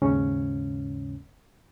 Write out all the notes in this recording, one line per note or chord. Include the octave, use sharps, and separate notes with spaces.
D#2 G#2 C#3 C#4